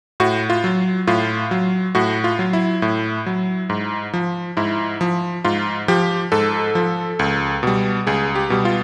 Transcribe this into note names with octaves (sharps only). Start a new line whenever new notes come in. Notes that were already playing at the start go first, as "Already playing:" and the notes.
A2 F#4
F4
F#3
A2 F4
F#3
A2 F#4
F4
F#3
E4
A2
F#3
G#2
F3
G#2 E4
F3
G#2 F4
F3 G4
G#2 A4
F3
C#2
B2 G3
C#2 G#4
G4
B2 G3
F4